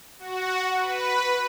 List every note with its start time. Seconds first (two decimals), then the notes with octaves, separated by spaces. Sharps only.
0.19 F#4
0.79 B4